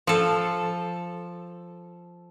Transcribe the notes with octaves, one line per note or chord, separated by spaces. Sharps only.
F3 A4